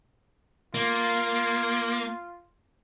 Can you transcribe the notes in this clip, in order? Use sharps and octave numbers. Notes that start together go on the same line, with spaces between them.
A#3 F4